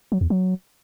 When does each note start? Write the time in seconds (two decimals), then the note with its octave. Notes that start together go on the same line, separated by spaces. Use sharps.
0.12 F#3
0.21 E2
0.30 F#3